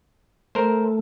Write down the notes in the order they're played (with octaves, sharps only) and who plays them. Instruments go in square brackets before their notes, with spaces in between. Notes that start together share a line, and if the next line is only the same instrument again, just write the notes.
[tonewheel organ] A3 [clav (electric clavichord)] A#4 C5